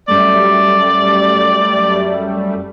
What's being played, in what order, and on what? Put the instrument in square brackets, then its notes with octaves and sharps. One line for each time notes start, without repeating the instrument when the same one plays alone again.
[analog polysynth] F#2 G3 A3 [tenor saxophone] D5